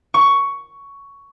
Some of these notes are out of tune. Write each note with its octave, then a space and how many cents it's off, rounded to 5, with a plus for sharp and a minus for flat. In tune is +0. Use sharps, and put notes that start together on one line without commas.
C#6 +10